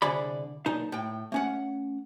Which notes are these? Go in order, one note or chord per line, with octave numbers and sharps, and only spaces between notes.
C2 D3 G#4 D5 B5
B1 A#2 D#4 A5
A2 G5
A3 C#4 F#5